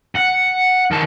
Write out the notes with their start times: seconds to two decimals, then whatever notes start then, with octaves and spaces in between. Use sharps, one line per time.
0.16 F#5
0.91 D#3 A5